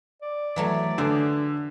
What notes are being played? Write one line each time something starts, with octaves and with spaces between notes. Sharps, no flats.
D5
E3 F#3 A3
D3 D4 G#4 C5